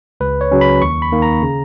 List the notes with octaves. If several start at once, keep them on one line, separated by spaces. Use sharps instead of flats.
C#2 B4
C#5
C#3 F#3 C#4
B5
D#2 C#6
B5
D#3 A#3
A#5
C#3